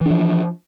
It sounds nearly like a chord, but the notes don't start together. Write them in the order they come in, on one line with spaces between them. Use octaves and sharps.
E3 D4 F3